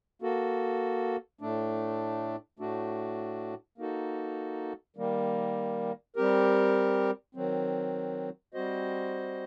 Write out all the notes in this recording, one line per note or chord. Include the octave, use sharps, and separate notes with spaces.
A#3 F#4 A4
A2 A3 D4
A2 A3 D4 F#4
A#3 D#4 F#4 A4
D#3 G3 A#3
G3 C4 G4 A#4
D#3 F#3 C4
G3 C4 F#4 C5 D#5